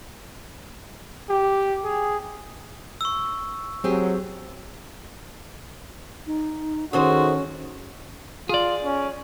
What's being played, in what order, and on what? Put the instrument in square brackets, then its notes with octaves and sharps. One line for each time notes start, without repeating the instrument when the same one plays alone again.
[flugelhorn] G4
G#4
[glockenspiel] C#6 E6
[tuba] F#3 [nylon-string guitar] C4 G4 G#4
[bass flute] D#4
[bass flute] D#3 [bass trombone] C#4 [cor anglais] F#4 [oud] G#4 A4 C5
[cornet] F4 [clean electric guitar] G#4 D5
[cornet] C#4